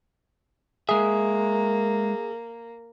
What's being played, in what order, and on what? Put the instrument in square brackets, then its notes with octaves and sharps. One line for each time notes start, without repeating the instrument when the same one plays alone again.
[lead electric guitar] G#3 E5 [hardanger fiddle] A#3 [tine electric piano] G#4